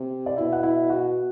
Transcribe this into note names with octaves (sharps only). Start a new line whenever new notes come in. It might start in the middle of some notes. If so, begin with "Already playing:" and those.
Already playing: C3
D5
B2 E4 E5
F#5
E4 E5
F#4 F#5